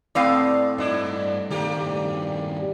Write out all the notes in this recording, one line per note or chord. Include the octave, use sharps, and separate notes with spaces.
A2 B3 C4 D5 F5
G2 D4 E4 D#5
G2 D#3 A3 A#3 G4